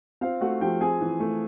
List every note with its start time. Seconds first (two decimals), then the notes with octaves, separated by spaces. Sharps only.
0.21 C4 F4 F5
0.41 A3 F#4 F#5
0.60 F3 G4 G5
0.81 C4 G#4 G#5
1.01 E3
1.20 A3